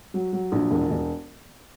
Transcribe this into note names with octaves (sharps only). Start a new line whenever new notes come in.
F#3
F#3
A#1
E1
E1